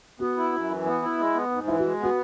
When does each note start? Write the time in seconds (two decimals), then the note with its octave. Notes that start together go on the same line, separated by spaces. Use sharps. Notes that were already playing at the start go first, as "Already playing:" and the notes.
0.20 B3 F#4
0.37 E4
0.52 F#2
0.69 E3
0.86 B3
1.02 E4
1.19 G#3
1.34 B3
1.51 G#2
1.67 E3 E4
1.79 G#3 F#4
2.00 B3 F#4